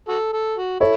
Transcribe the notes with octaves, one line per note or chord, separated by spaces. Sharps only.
F#4 A4
A4
F#4
E4 A4 C#5